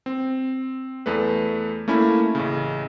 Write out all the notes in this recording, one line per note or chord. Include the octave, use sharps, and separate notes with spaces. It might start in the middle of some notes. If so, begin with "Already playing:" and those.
C4
E2 A3 B4
A3 A#3 C#4 E4
A1 C#3